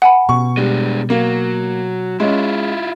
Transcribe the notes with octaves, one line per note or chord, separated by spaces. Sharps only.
F#5 G#5 B5
B2 C#6
G3 G#3 D4
F#3 A#3
G#3 C#4 E4 F4